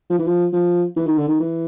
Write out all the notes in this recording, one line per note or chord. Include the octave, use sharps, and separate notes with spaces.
F3
E3
F3
F3
E3
D#3
D3
D#3
E3